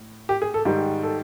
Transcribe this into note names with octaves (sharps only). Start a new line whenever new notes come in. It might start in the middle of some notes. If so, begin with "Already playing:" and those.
Already playing: A2
G4
G#4
A4
G#2 D#3 G3
A4